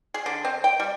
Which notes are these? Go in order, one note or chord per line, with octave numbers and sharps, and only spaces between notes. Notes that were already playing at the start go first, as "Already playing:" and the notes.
G#4
D3
C4
G5
G3